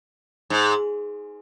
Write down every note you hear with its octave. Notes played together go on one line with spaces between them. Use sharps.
G#2